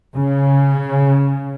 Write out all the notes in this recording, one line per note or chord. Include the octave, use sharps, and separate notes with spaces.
C#3